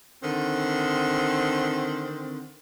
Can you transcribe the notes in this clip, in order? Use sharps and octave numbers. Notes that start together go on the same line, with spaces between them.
D3 D#3 C4